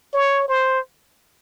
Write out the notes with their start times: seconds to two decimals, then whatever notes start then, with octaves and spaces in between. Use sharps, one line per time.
0.13 C#5
0.48 C5